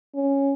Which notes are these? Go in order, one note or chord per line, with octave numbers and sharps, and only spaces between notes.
C#4